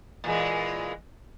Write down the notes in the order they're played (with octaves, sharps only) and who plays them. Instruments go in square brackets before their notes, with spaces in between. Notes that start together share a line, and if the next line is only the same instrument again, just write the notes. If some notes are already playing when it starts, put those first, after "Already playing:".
[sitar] A#2 E3 G#3